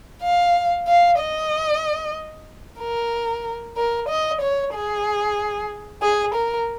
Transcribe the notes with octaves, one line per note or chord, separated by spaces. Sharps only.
F5
F5
D#5
A#4
A#4
D#5
C#5
G#4
G#4
A#4